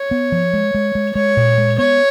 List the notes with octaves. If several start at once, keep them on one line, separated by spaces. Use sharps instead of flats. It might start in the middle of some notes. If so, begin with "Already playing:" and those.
Already playing: C#5
B3
F3
G#3
G#3
G#3
G#3 C#5
A#2
G#3
B3 C#5